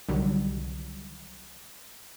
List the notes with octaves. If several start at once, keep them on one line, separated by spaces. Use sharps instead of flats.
C2 D3 D#3 F#3 G3